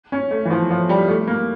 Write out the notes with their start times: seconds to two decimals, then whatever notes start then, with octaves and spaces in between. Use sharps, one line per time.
0.12 C#4
0.31 A3
0.45 E3
0.50 F3
0.70 F3
0.89 G3
1.09 A3
1.27 A#3